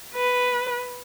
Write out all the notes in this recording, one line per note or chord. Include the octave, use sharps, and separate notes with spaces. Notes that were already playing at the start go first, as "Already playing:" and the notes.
B4